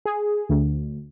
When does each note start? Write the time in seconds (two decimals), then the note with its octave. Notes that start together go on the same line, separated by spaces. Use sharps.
0.05 G#4
0.49 D2